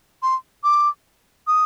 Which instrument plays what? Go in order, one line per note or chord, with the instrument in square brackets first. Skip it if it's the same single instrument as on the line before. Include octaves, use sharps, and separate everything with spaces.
[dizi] C6
D6
D#6